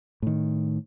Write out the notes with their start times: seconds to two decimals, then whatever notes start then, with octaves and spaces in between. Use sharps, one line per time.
0.22 A2 D#3